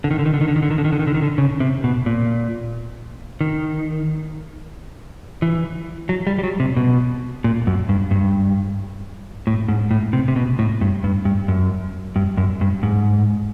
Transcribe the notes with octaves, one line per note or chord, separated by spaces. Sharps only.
D3
D#3
D3
D#3
D3
D#3
D3
D#3
D3
D#3
D3
D#3
D3
D#3
D3
D#3
D3
C#3
C3
B2
A#2
D#3
E3
F#3
G3
G3
F#3
C3
B2
A#2
F#2
G2
G2
A2
G#2
A2
C3
C3
B2
A2
G2
G2
G2
F#2
G2
F#2
G2
G#2